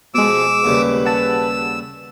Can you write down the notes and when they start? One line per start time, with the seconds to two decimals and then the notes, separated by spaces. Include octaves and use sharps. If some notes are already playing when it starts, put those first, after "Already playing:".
0.15 F2 B2 F3 G#3 D6 E6
0.65 D#2 C#3 G3 G#4 B4
1.05 F#5 A5 E6